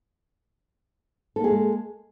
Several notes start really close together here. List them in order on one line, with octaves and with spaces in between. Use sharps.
A4 A#3 G#4 G#3